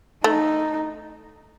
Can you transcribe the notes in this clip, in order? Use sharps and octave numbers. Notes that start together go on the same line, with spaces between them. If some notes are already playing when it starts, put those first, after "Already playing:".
A3 D#4